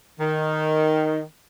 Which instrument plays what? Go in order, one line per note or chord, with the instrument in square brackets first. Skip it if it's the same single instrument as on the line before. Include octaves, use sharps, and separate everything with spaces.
[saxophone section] D#3